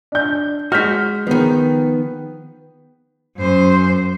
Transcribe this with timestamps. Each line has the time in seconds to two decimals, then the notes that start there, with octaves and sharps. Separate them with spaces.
0.12 D4 G6
0.72 G#3 F#4 F6 G6 B6
1.27 D#3 F3 B3 G#4
3.37 F#2 C5